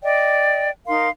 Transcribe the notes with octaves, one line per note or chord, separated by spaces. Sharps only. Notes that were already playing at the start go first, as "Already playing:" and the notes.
D5 D#5 G5
D#4 A#4 F5 C6